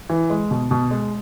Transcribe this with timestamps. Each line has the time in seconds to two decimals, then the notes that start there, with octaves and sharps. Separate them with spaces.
0.10 E3
0.30 G#3
0.51 B2
0.71 B2
0.91 G#3